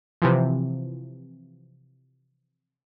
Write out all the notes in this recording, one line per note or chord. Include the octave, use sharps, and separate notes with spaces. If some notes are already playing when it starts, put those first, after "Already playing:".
C3 E3 F3